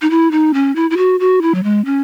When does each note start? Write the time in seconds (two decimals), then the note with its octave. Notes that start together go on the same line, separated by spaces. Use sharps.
0.02 D#4
0.10 E4
0.32 D#4
0.54 C#4
0.76 E4
0.90 E4
0.97 F#4
1.20 F#4
1.42 E4
1.55 F#3
1.64 G#3
1.85 C#4